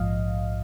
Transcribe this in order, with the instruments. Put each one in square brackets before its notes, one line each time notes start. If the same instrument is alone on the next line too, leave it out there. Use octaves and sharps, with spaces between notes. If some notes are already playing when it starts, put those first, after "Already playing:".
Already playing: [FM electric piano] A#1 G#2 F3 D#5 F5